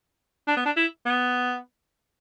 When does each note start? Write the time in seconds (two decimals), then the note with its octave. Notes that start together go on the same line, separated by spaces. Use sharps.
0.48 D4
0.57 B3
0.65 D4
0.76 E4
1.06 B3